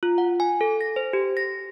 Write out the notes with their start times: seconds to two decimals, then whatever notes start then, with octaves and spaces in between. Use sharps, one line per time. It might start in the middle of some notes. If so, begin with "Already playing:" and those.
0.03 F4
0.18 F#5
0.40 G#5
0.61 A4
0.81 A#6
0.96 C5
1.13 G4
1.37 A#6